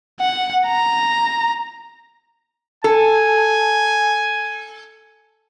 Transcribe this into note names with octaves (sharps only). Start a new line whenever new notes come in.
F#5
A#5
A4 G#5